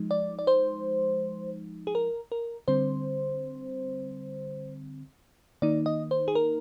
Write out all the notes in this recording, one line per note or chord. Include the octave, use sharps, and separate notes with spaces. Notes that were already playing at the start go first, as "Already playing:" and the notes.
Already playing: F3 G#3 D#4
D5
D5
C5
G#4
A#4
A#4
D3 G3 C4 C5
D#3 A#3 D#4 D5
D#5
C5
G#4
A#4